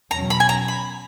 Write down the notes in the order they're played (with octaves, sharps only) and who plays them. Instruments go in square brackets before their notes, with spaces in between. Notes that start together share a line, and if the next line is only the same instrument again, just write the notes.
[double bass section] E2 B2 F#3 C#4 [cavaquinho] A#5
[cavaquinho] B5
G#5
A#5
B5